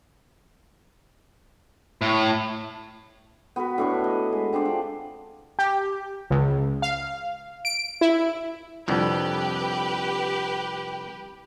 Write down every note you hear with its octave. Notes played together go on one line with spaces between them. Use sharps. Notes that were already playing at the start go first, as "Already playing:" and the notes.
A2
B3 F#4 A#4 B4
A2 D4 C#6
D#5
G#3
C4 D4 C5 D5
F4
G4
C#2
F5
D7
E4
C2 F2 D3 G4 B4